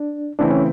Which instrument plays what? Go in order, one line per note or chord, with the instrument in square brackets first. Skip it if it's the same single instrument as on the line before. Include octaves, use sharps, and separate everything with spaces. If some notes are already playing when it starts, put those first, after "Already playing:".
Already playing: [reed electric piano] D4
[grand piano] C#3 E3 A3 C4 E4 [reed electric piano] D4
[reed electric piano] C#4